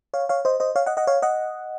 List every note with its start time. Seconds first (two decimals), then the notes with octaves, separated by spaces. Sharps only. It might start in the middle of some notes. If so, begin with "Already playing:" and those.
0.14 C#5 F5
0.29 C#5 F5
0.45 C5 D#5
0.60 C5 D#5
0.76 C#5 F5
0.86 D#5 F#5
0.97 D#5 F#5
1.07 C#5 F5
1.22 D#5 F#5